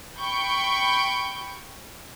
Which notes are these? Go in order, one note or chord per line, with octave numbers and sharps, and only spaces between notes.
G5 B5 C#6 G6